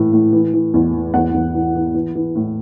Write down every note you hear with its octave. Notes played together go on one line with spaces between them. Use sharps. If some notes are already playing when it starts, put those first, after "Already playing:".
Already playing: A2 E3
A2
E3
E3
E2
E3
E2 F#5
E2
E3
E3
E3
E3
A2